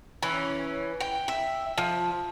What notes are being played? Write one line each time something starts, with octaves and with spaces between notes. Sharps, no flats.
E3 C#4
G5
E5
F3